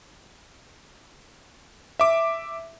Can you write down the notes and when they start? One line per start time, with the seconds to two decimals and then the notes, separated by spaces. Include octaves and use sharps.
2.00 E5 D6